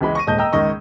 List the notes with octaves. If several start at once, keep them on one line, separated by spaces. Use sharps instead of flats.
C#2 E3 G#3 B5
C#6 A#6 D#7
D#1 G#2 D#5 A5 G6
D#5 G5 A#5 E6
C#2 G#2 D#3 D#5 C#6